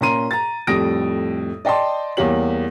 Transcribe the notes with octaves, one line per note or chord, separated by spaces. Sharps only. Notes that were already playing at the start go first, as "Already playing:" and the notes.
A#2 C#4 A#5 C6 D#7
A#5 A6
F2 A2 G3 D#6 A#6 D7
D5 D#5 G5 A5 C6
E2 G3 A#3 G4 C#5 F#7